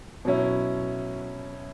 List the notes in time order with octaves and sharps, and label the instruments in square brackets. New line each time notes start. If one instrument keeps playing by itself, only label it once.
[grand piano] B2 F#3 C#4 E4